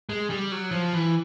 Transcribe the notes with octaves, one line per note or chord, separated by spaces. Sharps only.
G#3
G3
F#3
F3
E3